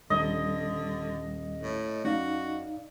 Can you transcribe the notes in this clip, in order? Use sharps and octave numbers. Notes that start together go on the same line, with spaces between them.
D#1 D#2 D3 G3 D4 D#5
A2
F#2 D#4 F#4 D5 F5